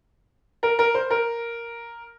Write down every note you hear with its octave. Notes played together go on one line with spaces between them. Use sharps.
A#4
A#4
C5
A#4